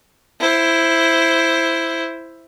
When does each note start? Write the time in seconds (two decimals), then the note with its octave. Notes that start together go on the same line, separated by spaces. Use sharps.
0.40 E4 C5